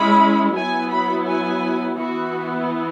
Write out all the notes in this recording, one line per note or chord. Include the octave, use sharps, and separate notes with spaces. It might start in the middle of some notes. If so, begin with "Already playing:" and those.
Already playing: G#3 C#4 E4 B5
F#3 B3 E4 G#5
B5
G#5
E3 B3 E4 F#4